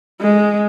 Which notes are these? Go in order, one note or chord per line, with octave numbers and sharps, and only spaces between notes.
G#3